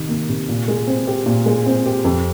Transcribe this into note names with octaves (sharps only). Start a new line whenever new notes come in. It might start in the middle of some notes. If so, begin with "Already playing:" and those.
Already playing: C3 D#3
A#3
C3
A#2
G#3
C4
G4
A#2
G#3
C4
G4
F2